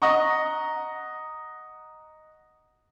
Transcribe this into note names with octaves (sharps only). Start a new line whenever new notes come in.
D#5 F#5 A#5 C#6